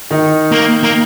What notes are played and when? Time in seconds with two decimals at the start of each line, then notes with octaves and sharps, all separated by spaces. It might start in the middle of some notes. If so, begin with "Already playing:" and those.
0.11 D#3 D#4
0.52 A#3
0.83 A#3